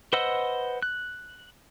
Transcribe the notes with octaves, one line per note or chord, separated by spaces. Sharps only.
B4 C5 D#5 F#5 E6
F#6